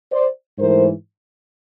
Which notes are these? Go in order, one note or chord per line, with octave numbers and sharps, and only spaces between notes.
C5 D5
G#2 E3 A3 A#4 C5